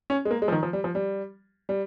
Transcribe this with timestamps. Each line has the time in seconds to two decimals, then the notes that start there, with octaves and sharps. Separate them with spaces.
0.10 C#4
0.25 G#3
0.31 A#3
0.42 G#3
0.48 F3
0.52 D#3
0.63 F3
0.73 G3
0.84 F3
0.95 G3
1.69 G3